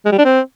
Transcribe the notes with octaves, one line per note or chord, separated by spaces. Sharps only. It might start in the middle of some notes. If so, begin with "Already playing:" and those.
G#3
G3
D4
C4